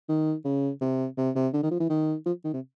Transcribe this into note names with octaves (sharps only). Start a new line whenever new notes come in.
D#3
C#3
C3
C3
C3
D3
D#3
F3
E3
D#3
F3
D#3
C3